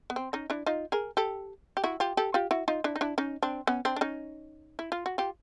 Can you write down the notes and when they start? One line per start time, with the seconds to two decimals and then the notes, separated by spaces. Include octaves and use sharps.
0.10 B3
0.16 C4
0.33 C#4 D#4
0.50 D4 E4
0.66 D#4 F4
0.92 G#4 A#4
1.17 G4 A4
1.77 G4
1.84 E4 F#4
2.00 F4 G4
2.17 G4 A4
2.34 F4 G4
2.51 E4 F#4
2.68 D#4 F4
2.84 D4 E4
2.96 D#4
3.01 D4 E4
3.18 C#4 D#4
3.43 C4 D4
3.67 B3 C#4
3.85 C4 D4
3.96 D4
4.01 C#4 D#4
4.79 E4
4.92 F4
5.06 F#4
5.18 F4 G4